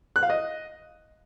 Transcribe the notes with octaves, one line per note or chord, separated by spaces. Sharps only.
F#6
F5
D#5